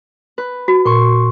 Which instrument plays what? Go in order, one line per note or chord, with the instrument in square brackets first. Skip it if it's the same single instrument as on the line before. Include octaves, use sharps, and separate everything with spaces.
[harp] B4
[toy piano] F#4
[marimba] A#2 [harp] C6 C#6